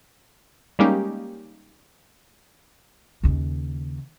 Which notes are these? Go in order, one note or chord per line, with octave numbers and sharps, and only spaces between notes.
G3 G#3 A#3 C#4 D#4 G4
D#2 C#3